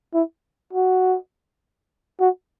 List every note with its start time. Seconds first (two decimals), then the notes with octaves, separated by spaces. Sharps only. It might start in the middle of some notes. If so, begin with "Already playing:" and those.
0.14 E4
0.73 F#4
2.20 F#4